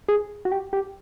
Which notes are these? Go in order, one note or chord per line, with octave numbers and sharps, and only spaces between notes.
G#4
F#4
G4
G4